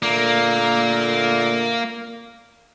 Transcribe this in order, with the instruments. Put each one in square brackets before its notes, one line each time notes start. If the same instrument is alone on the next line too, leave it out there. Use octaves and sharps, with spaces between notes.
[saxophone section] A#2 D3 A3 [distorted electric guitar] A#3